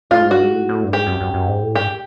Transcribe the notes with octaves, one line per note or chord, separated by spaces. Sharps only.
A2 F4
G#2
G2 F#4
G#2
A2
G#2
A2
G2
G#2 G4
F#2
F#2
F#2
G#2
A2
G#2 G4